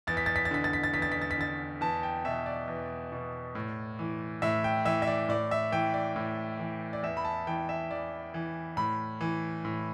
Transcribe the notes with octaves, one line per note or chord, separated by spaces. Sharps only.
E2 A6
B6
A6
B6
A6
D3 B6
A6
B6
A6
E2 B6
A6
B6
A6
B6
D3 A6
E2 A5
G5
B2 E5
D5
E2
B2
A2
E3
A2 E5
G5
E3 E5
E5
D5
A2 D5
E5
E3 G5
D5
A2
E3
D5
E2 E5
B5
A5
E3 G5
E5
E2 D5
E3
A2 B5
E3
A2